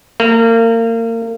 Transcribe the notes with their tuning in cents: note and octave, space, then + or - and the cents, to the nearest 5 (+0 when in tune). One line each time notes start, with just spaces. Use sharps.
A#3 -30